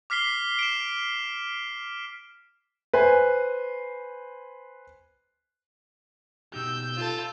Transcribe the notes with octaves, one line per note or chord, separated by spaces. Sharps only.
D6 F6 B6 C7 G7
D7 E7
B4 C5 G#5
B2 D#4 G4 E6 G6
F4 A4